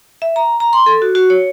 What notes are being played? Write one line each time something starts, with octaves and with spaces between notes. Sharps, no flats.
E5
A#5
A#5
C6
A4
F#4
F#4
C#5